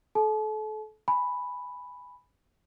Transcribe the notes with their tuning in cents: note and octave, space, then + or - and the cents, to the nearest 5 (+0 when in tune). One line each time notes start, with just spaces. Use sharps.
A4 -30 A5 -40
G#5 +0 B5 +0